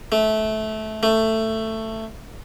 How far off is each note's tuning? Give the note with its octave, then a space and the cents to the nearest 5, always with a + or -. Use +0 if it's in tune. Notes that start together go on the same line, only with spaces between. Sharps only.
A3 -20
A3 +10